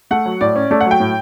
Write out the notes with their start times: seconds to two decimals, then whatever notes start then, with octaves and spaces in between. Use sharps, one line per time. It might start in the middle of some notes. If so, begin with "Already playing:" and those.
0.11 A3 F#5
0.26 F#3
0.41 A2 D5
0.56 C#4
0.71 A3 D5
0.81 F#5
0.85 F#3
0.91 G5
1.00 A2